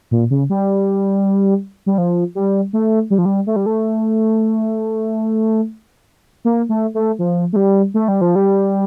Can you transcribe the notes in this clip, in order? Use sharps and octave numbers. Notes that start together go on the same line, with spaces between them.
A#2
C#3
G3
G3
F3
G3
A3
G3
F3
G3
A3
G3
A3
A#3
A3
A3
F3
A3
G3
A3
G3
F3
G3